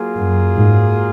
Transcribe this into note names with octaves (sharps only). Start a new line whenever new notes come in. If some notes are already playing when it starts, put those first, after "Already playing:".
Already playing: F#3 A#3 F4 G#4
F#2
G#2